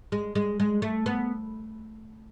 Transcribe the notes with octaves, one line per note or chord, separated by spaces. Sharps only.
G#3
G#3
G#3
A3
B3